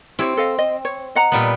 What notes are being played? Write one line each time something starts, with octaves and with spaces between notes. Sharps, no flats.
C4 E4 G4 C#5
A4 D#5 F5
D#5
C#5
D#5 F#5 A#5
A#2 G3 B3